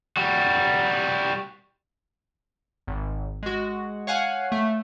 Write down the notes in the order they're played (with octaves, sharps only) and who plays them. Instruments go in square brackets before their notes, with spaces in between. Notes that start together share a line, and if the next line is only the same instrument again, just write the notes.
[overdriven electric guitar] G3 F#4
[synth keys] G#1
G#3 F#4
C#5 F5 F#5 G#5
A3